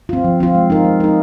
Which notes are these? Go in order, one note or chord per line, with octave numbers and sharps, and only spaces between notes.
C4 F4
F3
C4 F4
G#3
D#4 A#4
G#3
D#4 A#4